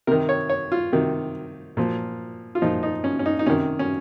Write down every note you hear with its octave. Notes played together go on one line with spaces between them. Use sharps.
C3 D#3 A#4
C#5
C#5
F4
C3 D#3
A#2 F3
F4
A#2 F3 D#4
D#4
C#4
C#4
D#4
D#4
C3 D#3 C#4
C#4